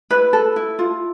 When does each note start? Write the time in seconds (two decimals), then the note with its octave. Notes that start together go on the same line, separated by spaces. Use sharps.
0.11 E4 B4
0.33 A4
0.56 E4
0.79 F4